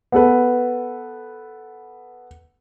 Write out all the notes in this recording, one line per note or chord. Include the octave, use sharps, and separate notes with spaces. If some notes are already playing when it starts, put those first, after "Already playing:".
B3 A4 B4